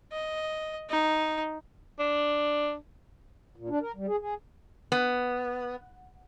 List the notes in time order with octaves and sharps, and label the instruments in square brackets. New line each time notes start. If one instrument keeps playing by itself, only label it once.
[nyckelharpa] D#5
D#4
[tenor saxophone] D4
[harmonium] A#2
D4
A#4
G3
G#4
G#4
[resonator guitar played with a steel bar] B3